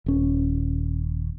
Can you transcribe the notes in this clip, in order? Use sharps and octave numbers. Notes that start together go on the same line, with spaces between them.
D#1 C#4